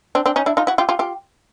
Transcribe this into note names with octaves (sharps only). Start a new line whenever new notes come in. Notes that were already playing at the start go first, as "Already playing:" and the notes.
C4 D4
C4 D4
C#4 D#4
D4 E4
D#4 F4
E4 F#4
F4 G4
F4 G4
F4 G4